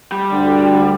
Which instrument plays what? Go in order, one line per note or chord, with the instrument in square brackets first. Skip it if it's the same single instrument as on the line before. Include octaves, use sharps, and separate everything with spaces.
[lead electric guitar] G3
[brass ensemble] D2 D3